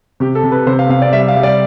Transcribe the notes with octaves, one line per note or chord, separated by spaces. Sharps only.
C3 G4
A4
C3
B4
C3 C5
F5
C3 F5
D5
G3 E5
F5
G3
D5